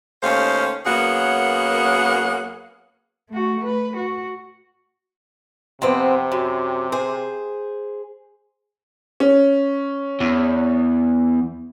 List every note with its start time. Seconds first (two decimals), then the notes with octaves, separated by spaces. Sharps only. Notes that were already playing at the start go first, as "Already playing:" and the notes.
0.23 D#2 A3 C#4 C5 F5
0.86 F#2 A#3 B3 G#4 C#5 F#5
3.29 A3 F#4
3.65 B4
3.97 F#4
5.82 F2 C3 B3 C4
6.32 F#2
6.92 G#4 C5
9.20 C#4
10.20 E2